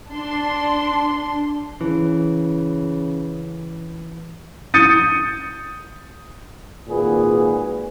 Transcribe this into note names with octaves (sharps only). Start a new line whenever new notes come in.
D4 C6
C#3 E3
D#6 G6 A6 C#7 D#7
G#1 A#2 F#4 G#4 B4